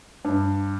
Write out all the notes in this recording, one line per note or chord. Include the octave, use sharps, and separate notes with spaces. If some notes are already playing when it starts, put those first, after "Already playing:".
G2